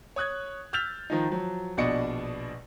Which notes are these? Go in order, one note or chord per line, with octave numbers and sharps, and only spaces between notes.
C#5 D#6 F#6 G#6
E6 F6 G6 A6 B6 F7
D#3 F3 D#4
F3 F#3
A#1 B2 D4 D5 D#5 C#7